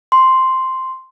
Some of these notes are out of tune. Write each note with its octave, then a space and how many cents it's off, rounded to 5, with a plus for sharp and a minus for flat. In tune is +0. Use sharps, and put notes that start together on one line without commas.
C6 +0